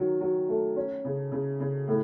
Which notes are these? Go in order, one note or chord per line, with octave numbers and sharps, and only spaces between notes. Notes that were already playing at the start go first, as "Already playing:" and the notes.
Already playing: D#3 F#3
F#3
A3
C#4
C#3
C#3
C#3
A2